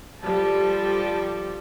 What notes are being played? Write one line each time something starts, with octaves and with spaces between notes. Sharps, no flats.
F3 G3 A4